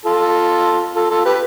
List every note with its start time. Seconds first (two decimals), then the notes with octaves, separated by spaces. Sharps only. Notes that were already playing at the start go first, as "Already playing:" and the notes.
0.06 F4 A4
0.95 F4 A4
1.11 F4 A4
1.25 G4 B4